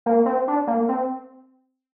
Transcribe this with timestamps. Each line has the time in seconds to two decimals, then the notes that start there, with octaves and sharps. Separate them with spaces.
0.06 A#3
0.26 C4
0.48 D4
0.67 A#3
0.89 C4